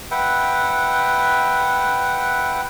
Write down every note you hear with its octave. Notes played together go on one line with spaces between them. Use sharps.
B4 E5 F#5 G5